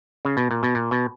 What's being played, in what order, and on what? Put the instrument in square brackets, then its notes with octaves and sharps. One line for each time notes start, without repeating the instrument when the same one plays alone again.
[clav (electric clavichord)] C#3
B2
A#2
B2
A#2
B2